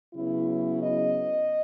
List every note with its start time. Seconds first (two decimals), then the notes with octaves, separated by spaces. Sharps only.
0.14 C#3 F#3 B3 E4
0.81 D#5